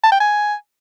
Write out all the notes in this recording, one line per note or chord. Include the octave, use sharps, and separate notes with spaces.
A5
G5
G#5